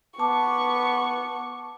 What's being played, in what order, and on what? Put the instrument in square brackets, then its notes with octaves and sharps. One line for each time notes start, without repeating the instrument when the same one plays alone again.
[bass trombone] B3 [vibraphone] A5 D6 [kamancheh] C#6